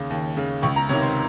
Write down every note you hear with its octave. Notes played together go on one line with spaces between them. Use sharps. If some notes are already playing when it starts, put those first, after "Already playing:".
Already playing: D#2 C#3
D#2
C#3
C#2 C#6
A#5
C3 D#3 C#5
C5